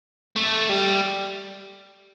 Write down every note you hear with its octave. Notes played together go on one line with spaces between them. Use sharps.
A3
G3